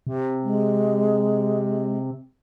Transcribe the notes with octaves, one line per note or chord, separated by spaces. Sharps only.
C3
G#3